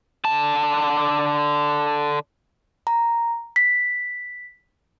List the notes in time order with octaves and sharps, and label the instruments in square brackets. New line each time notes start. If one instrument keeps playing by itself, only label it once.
[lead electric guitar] D3 A5
[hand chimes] A#5
B6